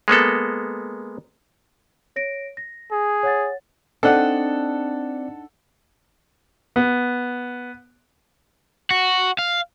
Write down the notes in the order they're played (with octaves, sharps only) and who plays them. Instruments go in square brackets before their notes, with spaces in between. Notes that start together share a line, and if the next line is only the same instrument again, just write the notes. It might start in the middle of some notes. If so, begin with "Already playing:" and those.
[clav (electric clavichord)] G#3 A#3 B3 A4
[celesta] C#5 A#6 D7
A#6
[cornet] G#4
[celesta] C#5 F#5 A6
[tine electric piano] C4 D5 [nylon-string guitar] D4 D#4 [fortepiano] A4 F#5
[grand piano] B3
[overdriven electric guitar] F#4
F5